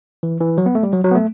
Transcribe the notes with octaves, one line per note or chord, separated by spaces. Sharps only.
E3
E3
F#3
B3
A3
G3
F#3
F#3
B3
A3